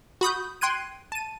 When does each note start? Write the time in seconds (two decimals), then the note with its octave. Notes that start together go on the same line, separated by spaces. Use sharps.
0.21 F#4 B5 D#6 G6
0.61 G5 C6 F#6 G#6 D#7
1.12 A5 D#7